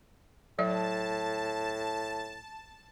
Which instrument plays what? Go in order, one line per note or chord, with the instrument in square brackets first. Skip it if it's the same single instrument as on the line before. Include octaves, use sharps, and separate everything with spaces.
[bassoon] A2 [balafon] F#3 D5 E5 [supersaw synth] A5